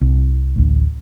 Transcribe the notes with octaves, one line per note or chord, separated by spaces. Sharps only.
C2
A1 D2